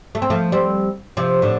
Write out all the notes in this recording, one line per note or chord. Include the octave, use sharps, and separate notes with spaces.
A3
C4
F3 A3
G3 C4
C3 F3
A2 D3